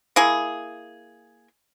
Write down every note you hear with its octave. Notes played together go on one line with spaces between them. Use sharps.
A#3 E4 G#4